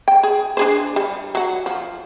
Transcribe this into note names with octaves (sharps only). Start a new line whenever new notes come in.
G5
G#4
D4 G#4 C5
G3
F#3 F#5
F3